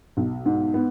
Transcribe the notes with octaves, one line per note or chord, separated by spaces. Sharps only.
B1
G#2
B3